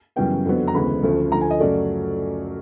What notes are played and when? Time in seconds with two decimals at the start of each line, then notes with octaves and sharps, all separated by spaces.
0.16 F#2 C#3 E3 G3 B3 G5
0.45 F2 D3 F#3 B3
0.68 A#5
0.74 D2 C#3 E3 G#3 B3 B5
1.03 D2 C#3 F3 A3
1.32 D2 D3 F3 A#5
1.41 G#5
1.51 D#5
1.60 F#2 C#3 F#3 A3 D5